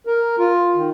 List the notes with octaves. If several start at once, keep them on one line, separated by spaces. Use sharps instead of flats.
A#4
F4
D#3